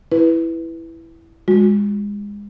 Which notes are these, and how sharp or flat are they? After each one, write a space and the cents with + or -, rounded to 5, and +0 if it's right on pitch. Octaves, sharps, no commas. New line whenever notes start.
E4 +0 B4 +0
G#3 -25 F#4 -40